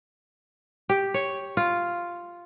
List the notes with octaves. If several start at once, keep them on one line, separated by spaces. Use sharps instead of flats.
G4
C#5
F4